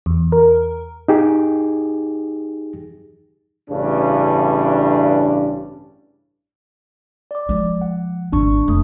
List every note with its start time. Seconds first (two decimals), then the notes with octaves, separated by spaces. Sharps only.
0.06 E2
0.32 A#4
1.08 D#4 G4 G#4
3.69 A1 G2 C#3 D4
7.31 D5 D6
7.49 F3 G#3
7.81 F#5
8.32 G#1 D3 D4 C#6
8.68 F1 A3 D#6